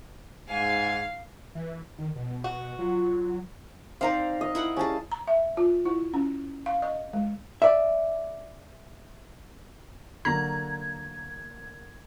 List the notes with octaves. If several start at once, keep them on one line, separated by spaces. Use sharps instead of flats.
G#2 F5 G#5
E3
D#3
B2
F#4
F#3 F4
C4 D#4 D5 F5 A#5
D#5
E4 A#4 F#5
G3 C#4 G#4 A5
A#5
E5
F4
E4
C#4
F5
D#5
G#3
D5 E5
D3 F#3 A#3 A#5 G#6